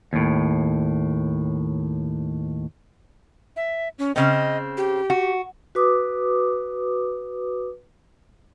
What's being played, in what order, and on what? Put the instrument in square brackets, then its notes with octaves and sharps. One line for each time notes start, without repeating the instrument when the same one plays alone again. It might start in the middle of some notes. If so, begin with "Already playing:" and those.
[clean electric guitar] D#2 A2
[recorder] E5
C#4
[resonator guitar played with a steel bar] C#3 C4 [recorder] D#5
[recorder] G4
[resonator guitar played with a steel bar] F#4
[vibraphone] F#4 B4 D6 D#6